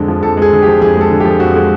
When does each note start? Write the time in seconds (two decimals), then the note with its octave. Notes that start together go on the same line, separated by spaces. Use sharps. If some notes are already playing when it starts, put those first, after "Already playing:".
Already playing: F2 D3 G#3
0.08 F3
0.23 F2 A4
0.37 G#3 G#4
0.52 D3
0.62 F3 G4
0.81 F2 G#4
0.96 G#3
1.01 A4
1.11 D3
1.20 F3 G4
1.40 F2 F#4
1.56 G#3